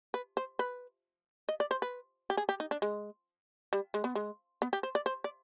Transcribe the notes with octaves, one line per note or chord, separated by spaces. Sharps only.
B4
C5
B4
D#5
D5
C5
B4
G4
G#4
G4
D#4
D4
G#3
G3
G#3
B3
G#3
B3
G4
C5
D5
C5
D5